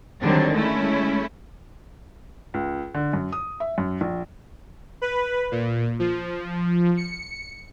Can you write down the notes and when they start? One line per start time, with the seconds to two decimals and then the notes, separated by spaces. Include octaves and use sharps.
0.22 D3 D#3 F#3 G3 C4 D4
0.52 G#3 A3 C#4 E4
2.54 C#2
2.94 D3
3.13 F#2
3.32 D#6
3.60 E5
3.78 F#2
4.01 A#1
5.02 B4
5.51 A#2
5.99 F3
6.97 C#7